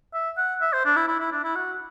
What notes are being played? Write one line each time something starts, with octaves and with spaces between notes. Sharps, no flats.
E5
F#5
E5
C5
D4
E4
E4
E4
D4
E4
F#4